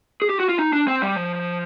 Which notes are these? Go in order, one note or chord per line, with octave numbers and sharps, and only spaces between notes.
G#4
G4
F#4
F4
D#4
D4
C4
G3
F3